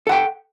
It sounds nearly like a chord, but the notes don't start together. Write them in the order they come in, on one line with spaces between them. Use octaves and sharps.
A4 F#5 G5